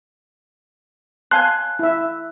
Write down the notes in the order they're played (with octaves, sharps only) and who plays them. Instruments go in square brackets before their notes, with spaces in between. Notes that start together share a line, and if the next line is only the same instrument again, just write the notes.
[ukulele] C#5 F5 A5 [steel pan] G#5 C6 [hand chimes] F#6
[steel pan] E4 E5